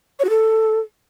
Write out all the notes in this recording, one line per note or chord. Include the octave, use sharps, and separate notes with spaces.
C#5
F#4
A4